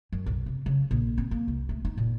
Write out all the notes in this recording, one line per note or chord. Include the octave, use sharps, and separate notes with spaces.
F#2
B1
C3
C#3
A#1
C4
A#3
C2
A3
D#4
A#2